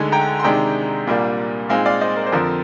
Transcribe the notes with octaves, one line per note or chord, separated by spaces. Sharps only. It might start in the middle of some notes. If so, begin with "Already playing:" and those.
Already playing: D2 D3 G#3 D#4 G#5
G5 A#5
C6
C3 D#3 G#3 D4 G5 A#5
C2 A#2 G3 A#3 D4
A#2 G#3 C4 D#4 F5 G#5
D5 F5
C5 D#5
A#4
C5
F2 D3 F3 C4 A#4